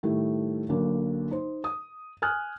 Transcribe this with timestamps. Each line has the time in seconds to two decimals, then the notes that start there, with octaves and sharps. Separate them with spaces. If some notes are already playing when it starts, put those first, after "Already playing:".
0.03 A2 D#3 G3 A3
0.69 B1 D3 A#3
1.31 D#4 C5
1.64 D#6
2.22 G#5 D#6 F6 F#6